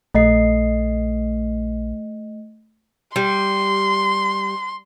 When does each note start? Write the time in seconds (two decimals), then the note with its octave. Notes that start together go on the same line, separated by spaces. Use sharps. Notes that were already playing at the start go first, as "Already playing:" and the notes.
0.14 A#1 A3 D#5 C7
3.16 G3 C6